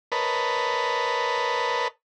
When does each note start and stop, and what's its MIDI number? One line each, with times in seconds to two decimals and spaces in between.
0.12 1.88 70
0.12 1.88 71
0.12 1.88 73
0.12 1.88 75
0.12 1.88 81
0.12 1.88 83